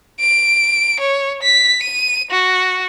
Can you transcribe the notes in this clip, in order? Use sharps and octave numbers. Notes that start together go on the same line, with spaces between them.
D7
C#5
B6
D#7
F#4